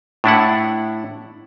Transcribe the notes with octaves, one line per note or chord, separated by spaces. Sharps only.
A2 D4 E4 F#5